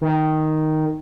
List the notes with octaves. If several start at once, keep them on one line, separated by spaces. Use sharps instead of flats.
D#3